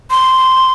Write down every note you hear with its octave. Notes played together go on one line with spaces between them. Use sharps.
C6